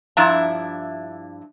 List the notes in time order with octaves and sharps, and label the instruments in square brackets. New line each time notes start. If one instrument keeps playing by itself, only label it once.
[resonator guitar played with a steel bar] G2 F3 D4 E4 E5 A#5